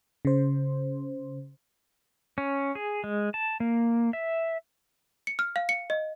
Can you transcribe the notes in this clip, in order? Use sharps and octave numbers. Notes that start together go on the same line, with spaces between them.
C#3 C5
C#4
G#4
G#3
A5
A#3
E5
C#7
F6
F5
C#7
D#5